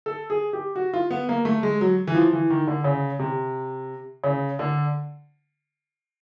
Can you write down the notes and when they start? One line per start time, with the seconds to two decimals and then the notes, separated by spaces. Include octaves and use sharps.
0.06 A4
0.30 G#4
0.53 G4
0.76 F#4
0.93 F4
1.11 B3
1.29 A#3
1.45 A3
1.63 G#3
1.81 F#3
2.07 E3
2.15 F3
2.33 E3
2.50 D#3
2.67 D3
2.84 C#3
3.19 C3
4.24 C#3
4.59 D3